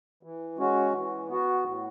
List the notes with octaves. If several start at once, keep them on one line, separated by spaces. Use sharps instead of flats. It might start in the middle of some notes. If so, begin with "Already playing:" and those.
E3
G#3 C#4 F#4
E3
B3 F#4
A2